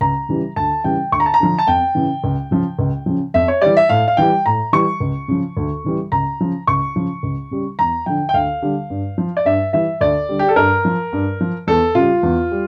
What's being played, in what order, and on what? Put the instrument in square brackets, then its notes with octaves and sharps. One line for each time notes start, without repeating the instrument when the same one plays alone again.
[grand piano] C#2 A#5
C#3 E3 G3
D2 A5
C#3 E3 G3 G5
D2 C#6
A#5
A5
A#5
D3 F3
A5
F2 G5
C#3 E3
C#2
C#3 F3
C#2
C#3 F3
F2 E5
C#5
E3 G3 D5
E5
A2 F5
F5
E3 G3 G5
A2 A#5
E3 G3 C#6
C#2
C#3 F3
D2
C#3 E3 G3
C#2 A#5
C#3 F3
C#2 C#6
C#3 F3
C#2
C#3 G3
E2 A#5
D3 F3 G5
G5
D2 F5
D3 G3
G2
F3
D5
G2 E5
E3 G3 E5
D2 D5
D3 G3
G4
A4
G2 A#4
F3
G2
F3
E2 A4
C#3 G3 F4
E2
G3